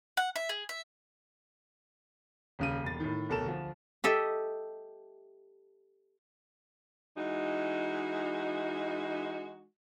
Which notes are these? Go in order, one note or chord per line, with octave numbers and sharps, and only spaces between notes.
F#5
E5
G#4
E5
D#1 C#3 D#7
E1 A6
A2 D#3
D1 B1 A4 A#4 E7
D2 F3
G4 A4 D#5 E5
E3 G#3 D#4 F#4